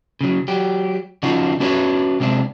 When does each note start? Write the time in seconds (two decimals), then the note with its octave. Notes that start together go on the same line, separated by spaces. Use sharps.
0.21 C#3 F#3
0.48 F#3 G4
1.23 C#3 F3 D4 D#4 F4 F#4
1.60 C#4 D4 F#4 B4 C#5 D5
2.20 C3 G#3 C4 D4